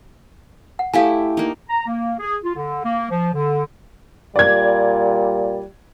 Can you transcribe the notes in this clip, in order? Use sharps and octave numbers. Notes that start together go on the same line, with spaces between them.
F#5
A3 E4 G4 A4 F5 G#5
A#3 D#4
A#5
A#3
G#4
F4
D3
A#3
F3
D3
A#2 G3 D5 G#6